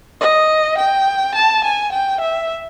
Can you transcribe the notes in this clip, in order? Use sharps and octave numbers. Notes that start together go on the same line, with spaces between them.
D#5
G5
A5
G#5
G5
E5